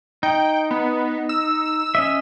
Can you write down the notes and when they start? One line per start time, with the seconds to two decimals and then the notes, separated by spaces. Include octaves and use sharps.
0.23 D#4 G5
0.71 B3
1.29 E6
1.95 C#4 D#5 E5